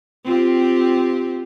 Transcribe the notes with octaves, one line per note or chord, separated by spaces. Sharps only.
C4 F4 G4